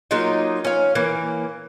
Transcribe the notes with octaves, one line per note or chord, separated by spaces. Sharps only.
F#3 A#3 D#4 F4
C#4 F5
E3 A#3